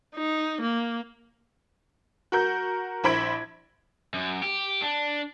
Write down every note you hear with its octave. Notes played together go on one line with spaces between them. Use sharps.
D#4
A#3
F#4 A#4 G6
A#1 E4 C5 B5 G#6 D7
F#2
G4
D4